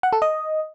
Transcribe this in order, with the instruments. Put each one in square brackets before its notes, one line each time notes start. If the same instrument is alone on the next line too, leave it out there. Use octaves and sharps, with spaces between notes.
[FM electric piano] F#5
A4
D#5